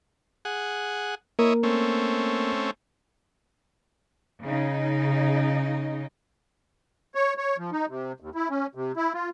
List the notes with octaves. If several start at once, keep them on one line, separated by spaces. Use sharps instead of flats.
G#4 F#5
A#3 E4 A#4 C#5 D#5
A3 C4 C#4
C#3 D#4
C#5
C#5
F3
D#4
C3
D#2
E4
C#4
C3
E4
F4